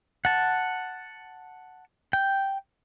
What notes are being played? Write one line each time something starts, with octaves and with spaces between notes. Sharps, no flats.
F#5 A5
G5